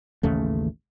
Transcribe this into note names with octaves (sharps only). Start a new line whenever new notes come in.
A1 D#2 C#3 A3